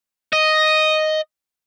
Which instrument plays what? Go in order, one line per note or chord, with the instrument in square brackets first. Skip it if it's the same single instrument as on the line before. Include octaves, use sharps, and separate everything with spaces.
[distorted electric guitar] D#5